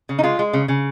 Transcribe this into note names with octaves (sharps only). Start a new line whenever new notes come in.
C#3
D#4
G#3 F4
G#3
C#3
C#3